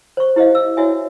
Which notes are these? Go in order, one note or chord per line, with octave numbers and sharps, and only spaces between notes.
C5 C#6
E4 G4 C5 D#5 F5
E6
E4 F#4 C#5 E5 G#5